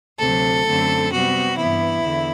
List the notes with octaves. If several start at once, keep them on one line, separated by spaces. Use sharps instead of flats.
D2 C3 F#3 A4
F#2 D3 A3 C4
C3 G3 B3 F#4
G2 E3 B3 E4
E2 D3